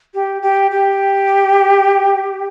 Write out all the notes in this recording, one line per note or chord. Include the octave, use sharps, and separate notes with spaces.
G4
G4
G4